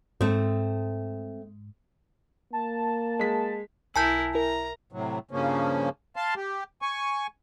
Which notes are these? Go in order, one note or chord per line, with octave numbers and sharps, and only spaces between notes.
G#2 A3 C4
A#3 A5
G#3 B6
B1 E4 A#4 G#5 A5 G6
E4 A#4 A#5
A2 C3 F#3
G2 C#3 F3 A#3 C#4
F5 A5 C6
G4
G#5 C#6